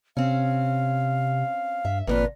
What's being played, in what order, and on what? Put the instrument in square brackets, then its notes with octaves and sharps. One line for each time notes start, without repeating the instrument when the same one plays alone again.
[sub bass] C3 [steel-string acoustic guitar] C4 C#4 [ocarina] F5
[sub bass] G2 [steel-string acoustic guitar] E5
[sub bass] G#1 [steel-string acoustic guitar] F2 A#2 F4 [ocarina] B4